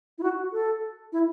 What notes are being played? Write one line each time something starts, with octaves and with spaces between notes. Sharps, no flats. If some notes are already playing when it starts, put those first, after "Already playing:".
E4
F#4
A4
E4